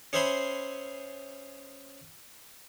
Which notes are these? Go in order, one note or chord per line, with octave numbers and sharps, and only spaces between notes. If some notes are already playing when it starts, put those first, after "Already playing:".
C#4 G#4 C5 E5 B5 C6